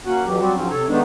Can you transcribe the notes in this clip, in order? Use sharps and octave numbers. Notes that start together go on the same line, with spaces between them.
A#3 C#4 F#4 F#5
F2 E3 F#3 G4
F#3 G3 C4 F#4 G4
G#2 F3 F#3 C4 C#4
C3 A4 C#5
D#3 G#3 A3 B3 D4 D#4